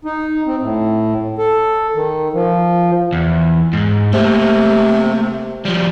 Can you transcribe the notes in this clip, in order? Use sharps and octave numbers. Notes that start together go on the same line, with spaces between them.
D#4
C4
A2
A4
D#3
F3
E2
G#2
C3 A3 A#3
F3 G3